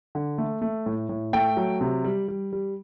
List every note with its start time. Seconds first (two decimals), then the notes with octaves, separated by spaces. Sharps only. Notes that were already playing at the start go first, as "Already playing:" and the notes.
0.15 D3
0.38 A3
0.62 A3
0.86 A2
1.09 A2
1.33 A3 G5
1.57 F#3
1.81 C3
2.04 G3
2.28 G3
2.52 G3